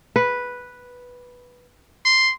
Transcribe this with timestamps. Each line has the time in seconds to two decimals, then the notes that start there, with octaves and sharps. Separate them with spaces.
0.16 B4
2.06 C6